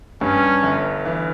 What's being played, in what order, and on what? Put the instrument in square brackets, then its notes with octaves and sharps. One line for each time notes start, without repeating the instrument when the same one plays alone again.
[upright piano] G2 [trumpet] C#4
[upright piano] G1
E3